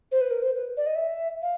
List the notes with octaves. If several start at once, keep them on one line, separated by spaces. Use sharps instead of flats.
C5
B4
A#4
C5
B4
D5
D#5
E5
F5